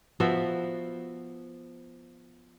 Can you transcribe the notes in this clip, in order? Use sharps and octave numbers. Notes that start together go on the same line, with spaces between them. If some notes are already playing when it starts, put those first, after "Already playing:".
F3 B3 F#4 E5